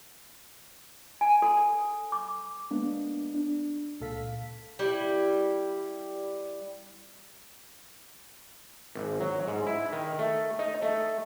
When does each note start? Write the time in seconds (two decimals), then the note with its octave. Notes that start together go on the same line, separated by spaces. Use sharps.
1.21 G#5
1.42 A4
2.12 D6
2.71 G#3 A#3 B3 D4
3.34 D4
4.00 C#2 A#2 A4 F5 B6
4.79 G3 E4
8.95 G#1
9.20 F#3
9.47 G#2
9.67 E4
9.93 D#3
10.19 A3
10.59 D#4
10.82 A3